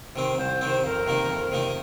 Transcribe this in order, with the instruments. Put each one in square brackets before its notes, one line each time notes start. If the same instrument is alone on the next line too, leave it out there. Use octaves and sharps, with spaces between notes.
[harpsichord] C3 D#3 C4
[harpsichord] C2 [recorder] C5
[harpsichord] C3 D#3 C4
[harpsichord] F2 [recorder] A#4
[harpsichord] C3 D#3 A#3 D#4
F2
C3 D#3 A#3 D#4